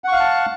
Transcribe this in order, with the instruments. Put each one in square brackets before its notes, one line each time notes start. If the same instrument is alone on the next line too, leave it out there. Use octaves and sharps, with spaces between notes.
[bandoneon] F#5
C#6
F5
F#6
A5